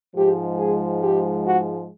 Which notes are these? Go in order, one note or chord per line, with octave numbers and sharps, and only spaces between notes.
G#2 F3 G#3 G4
G#4
G4
F#4